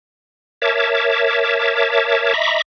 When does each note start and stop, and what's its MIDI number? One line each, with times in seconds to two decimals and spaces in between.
0.62 2.33 70
0.62 2.33 73
0.62 2.33 76
0.62 2.33 81
0.62 2.33 86
2.34 2.62 75
2.34 2.62 76
2.34 2.62 82
2.34 2.62 83
2.34 2.62 85
2.34 2.62 86